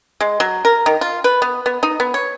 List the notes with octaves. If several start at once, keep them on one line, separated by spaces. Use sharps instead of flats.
G#3
F#3
A#4
D#3
F4
B4
B3
B3
D#4
B3
C#5